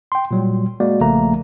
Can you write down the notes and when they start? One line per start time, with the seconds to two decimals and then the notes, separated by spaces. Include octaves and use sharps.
0.12 G5 C6
0.31 A#2 F#3 G3
0.80 G#3 A#3 F#4 D5
1.01 A#1 C#3 F3 A3 A#3 A#5